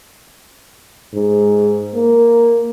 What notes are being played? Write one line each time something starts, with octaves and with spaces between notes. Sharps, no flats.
G#2
A#3